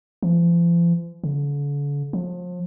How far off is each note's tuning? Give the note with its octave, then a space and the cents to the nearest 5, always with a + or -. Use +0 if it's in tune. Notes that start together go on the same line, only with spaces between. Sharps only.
F3 -40
D3 -40
F3 +35